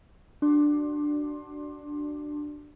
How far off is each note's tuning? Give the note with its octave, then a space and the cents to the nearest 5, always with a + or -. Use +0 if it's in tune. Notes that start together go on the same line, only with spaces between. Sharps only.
D4 +10 F#4 +30 C6 +25